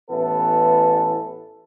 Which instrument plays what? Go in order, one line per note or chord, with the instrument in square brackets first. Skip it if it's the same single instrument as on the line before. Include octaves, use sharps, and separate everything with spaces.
[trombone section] A1 E3 B3 A4 B4